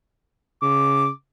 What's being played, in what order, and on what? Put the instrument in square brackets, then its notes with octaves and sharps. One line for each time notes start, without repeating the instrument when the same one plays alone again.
[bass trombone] C#3 [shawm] D6